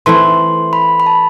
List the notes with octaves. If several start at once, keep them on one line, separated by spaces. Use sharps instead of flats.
E3 A3 C4 E4 C6
B5
B5
A5